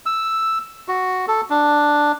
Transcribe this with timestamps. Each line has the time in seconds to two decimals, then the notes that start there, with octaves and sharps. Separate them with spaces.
0.06 E6
0.88 F#4
1.28 A4
1.50 D4